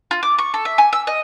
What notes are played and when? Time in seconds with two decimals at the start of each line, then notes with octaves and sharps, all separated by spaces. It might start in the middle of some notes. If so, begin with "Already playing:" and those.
0.11 F4
0.23 D6
0.38 C#6
0.54 A4
0.65 E5
0.78 G#5
0.93 E6
1.07 D#5